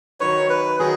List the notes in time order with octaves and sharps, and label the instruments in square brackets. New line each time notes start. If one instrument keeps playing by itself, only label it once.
[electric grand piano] D#3 F#3 D#4 B4 [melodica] C#5
[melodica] B4
[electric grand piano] D#3 F#3 [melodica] G#4